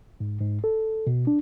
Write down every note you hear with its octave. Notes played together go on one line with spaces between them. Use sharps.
G#2
G#2
A4
B2
D4